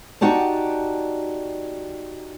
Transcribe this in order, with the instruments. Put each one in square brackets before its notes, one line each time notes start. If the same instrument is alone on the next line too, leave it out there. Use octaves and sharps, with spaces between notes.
[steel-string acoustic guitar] D#4 F#4 G4 D5 A5